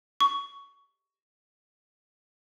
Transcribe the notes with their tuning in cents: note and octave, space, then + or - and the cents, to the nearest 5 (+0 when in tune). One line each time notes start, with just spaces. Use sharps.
C#6 +15